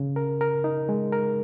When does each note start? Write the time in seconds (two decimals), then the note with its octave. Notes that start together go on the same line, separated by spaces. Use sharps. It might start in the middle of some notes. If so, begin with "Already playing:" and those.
Already playing: C#3
0.16 A#4
0.41 A#4
0.64 D#4
0.89 G#3
1.13 A#4